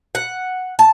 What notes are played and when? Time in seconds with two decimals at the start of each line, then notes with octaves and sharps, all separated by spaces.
0.15 F#5
0.79 A5